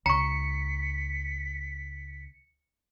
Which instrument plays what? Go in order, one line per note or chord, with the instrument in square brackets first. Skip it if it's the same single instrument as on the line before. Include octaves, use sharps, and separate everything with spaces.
[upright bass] C#2 [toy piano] A#5 C#6 [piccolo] B6 [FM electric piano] C#7